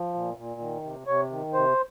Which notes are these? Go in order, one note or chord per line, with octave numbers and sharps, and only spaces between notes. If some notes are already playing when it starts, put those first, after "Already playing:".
Already playing: F3
A#2
A#2
D#3
C3
C3 C#5
D#3
C3 C5